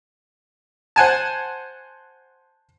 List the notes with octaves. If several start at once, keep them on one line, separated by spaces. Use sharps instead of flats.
C5 F#5 G#5 A5